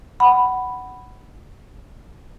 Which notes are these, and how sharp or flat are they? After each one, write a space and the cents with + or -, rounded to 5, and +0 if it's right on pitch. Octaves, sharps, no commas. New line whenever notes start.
F#5 +15 B5 +0